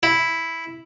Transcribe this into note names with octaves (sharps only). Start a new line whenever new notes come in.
E4